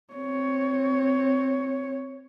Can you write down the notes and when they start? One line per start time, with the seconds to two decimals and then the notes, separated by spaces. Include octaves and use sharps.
0.13 C4 C#5